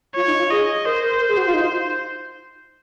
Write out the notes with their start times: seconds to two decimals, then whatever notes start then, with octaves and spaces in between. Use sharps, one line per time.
0.15 F4 C#5
0.27 D#4
0.38 F4
0.50 G#4 D#5
0.85 A#4 C5
1.03 A#4
1.20 A#4
1.29 G#4
1.37 F#4
1.47 F4
1.54 D#4